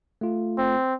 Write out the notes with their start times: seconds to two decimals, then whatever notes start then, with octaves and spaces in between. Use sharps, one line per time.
0.21 A3 F4
0.58 C4